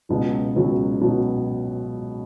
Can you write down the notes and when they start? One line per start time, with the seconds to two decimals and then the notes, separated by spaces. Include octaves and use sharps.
0.09 C#2 B2 F#3
0.56 C#2 B2 F#3
1.01 B2 F#3